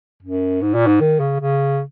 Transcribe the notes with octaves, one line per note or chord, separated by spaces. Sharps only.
F#2
G#2
A#2
G#2
D#3
C#3
C#3